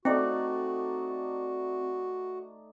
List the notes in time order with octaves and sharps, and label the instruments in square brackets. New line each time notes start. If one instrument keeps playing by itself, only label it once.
[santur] A3 D#4 D5 [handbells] C4 [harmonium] F#4